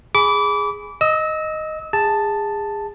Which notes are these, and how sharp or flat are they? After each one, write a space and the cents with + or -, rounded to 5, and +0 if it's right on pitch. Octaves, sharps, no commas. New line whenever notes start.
G#4 +0 B5 +0 D6 -25
D#5 +0 E6 -30
G#4 -25 A5 +0